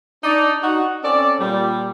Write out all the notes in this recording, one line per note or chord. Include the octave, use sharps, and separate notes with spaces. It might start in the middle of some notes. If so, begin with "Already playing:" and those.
D4 D#4 D5
D#4 F#4
C4 C#4 A4 D5
A#2 G3